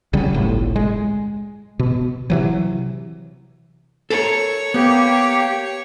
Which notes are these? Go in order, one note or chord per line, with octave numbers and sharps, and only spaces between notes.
C2 C#3 F#3 G3
G1 C2 A2
G#3
B2
C3 E3 F#3
A4 A#4 C#5
A#3 B3 G4